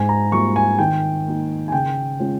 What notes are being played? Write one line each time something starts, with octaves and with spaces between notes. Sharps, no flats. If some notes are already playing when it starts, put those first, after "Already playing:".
Already playing: G#2 G#5
A#5
G3 A#3 F4 C#6
G#5
D#3 G5
A#3 D#4
G#5
C#3 G5
G#3 C#4 F4